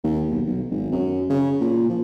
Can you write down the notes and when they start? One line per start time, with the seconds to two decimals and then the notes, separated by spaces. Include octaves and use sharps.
0.04 D#2
0.31 B1
0.47 B1
0.71 G#1
0.92 F#2
1.30 C#3
1.61 A#2
1.89 F3